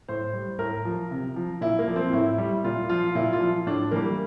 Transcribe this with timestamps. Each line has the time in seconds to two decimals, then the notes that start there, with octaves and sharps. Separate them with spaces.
0.09 A2 C5
0.33 G3
0.59 A2 A#4
0.85 F3
1.11 C3
1.36 F3
1.61 A#2 E4
1.79 A#3
1.88 F3
1.96 C4
2.13 A2 E4
2.38 G3
2.64 A#2 F4
2.89 F3 F4
3.15 A#2 E4
3.33 F4
3.40 F3
3.67 A2 D4
3.91 E3 G3 A#3